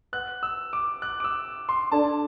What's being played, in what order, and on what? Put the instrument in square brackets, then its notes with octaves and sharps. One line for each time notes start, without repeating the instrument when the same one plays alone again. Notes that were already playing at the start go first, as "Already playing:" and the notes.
[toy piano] B4 F#5 C6 [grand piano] F#6
[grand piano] E6
D6
F#6
D6
E6
C6
[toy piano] D4 A4 D5 [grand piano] A5